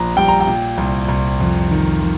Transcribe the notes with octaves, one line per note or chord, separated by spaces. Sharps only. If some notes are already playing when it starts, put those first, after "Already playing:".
Already playing: A#1 A#2 A#5
G3 G5
A#5
G5
A#2
C2
C2
F2
D#3
D#3